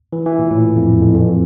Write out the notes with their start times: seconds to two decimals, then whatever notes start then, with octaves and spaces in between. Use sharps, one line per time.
0.13 E3
0.26 E3
0.39 A#2
0.51 A2
0.76 F2
0.90 E2
1.02 F2
1.15 F2